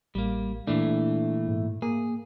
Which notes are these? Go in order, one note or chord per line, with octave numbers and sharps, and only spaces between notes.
A1 G3 A#3
A#2 E3 A3 D4
G#2
A#3 G#4